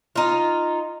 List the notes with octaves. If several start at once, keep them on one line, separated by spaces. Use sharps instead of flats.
D#4 F4